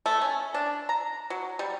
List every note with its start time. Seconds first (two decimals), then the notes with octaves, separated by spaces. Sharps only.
0.06 A3
0.21 C#4
0.54 D4
0.89 A#5
1.30 F#3
1.59 G3